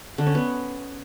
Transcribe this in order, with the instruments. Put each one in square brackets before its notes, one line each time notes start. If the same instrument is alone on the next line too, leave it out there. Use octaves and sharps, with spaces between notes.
[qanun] D3
C#4
B3